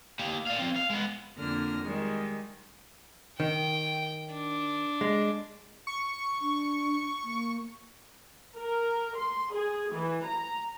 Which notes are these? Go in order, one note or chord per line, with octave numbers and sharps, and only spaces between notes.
A#3 G4
D5 F5
F3 C4
F5
G#3 B3
F2 D3 A#3 F6 A#6
D#3 G3 G#3
D#3 G5
D4
G#3
C#6
D4
A#3
A#4
C6
G#4
E3
A#5